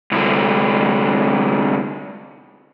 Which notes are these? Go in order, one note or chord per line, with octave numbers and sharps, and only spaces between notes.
C2 D3